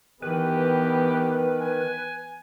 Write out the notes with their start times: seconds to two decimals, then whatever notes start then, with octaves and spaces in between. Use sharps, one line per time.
0.22 D#3 E3 B3 G4 B4
1.60 G#5